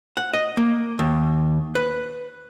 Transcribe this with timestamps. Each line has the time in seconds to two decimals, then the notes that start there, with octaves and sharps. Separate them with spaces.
0.17 F#5
0.33 D#5
0.57 A#3
0.99 D#2
1.75 B4